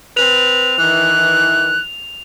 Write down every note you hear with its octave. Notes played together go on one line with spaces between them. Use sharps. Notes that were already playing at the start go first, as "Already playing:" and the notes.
C4 B4 F7
D#3 E3 F#6